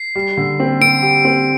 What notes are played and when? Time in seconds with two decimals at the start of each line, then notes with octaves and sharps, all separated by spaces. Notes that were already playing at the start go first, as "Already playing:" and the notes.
Already playing: C7
0.16 G3
0.37 D3
0.60 C4
0.81 C4 D7
1.03 G4
1.25 C4